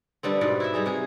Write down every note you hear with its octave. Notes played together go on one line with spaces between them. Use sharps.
D3 G3 B3 C4
G#2 B2 B4 D5
E4 F#4 E5
G3 D#4 G#4
C3 G#4